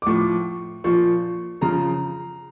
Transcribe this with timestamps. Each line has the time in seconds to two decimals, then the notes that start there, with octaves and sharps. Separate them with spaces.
0.02 D6
0.06 A2 F3 C#6
0.84 A#2 F3 C#6
1.61 C#3 F3 A#5